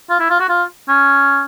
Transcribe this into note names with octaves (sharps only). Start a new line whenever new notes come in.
F4
E4
F4
F#4
F4
C#4